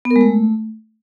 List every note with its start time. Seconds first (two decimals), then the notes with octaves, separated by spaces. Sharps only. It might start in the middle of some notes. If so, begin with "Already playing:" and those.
0.05 B3
0.10 A#4
0.16 G#3
0.21 A3